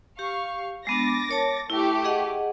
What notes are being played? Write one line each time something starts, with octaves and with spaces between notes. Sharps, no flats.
G4 F5 C#6
G#3 B3 D4 D6 A6 A#6
A#4 C#5 A5
A3 E4 G4
G#4 D#5 F#5